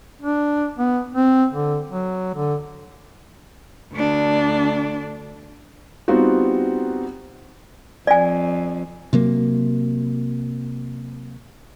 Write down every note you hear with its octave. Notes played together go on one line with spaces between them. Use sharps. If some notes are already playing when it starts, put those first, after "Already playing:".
D4
B3
C4
D3
F#3
D3
D2 D4
G3 B3 C4 D#4 F4 F#4
F2 D5 G#5
C3 F#3 A#3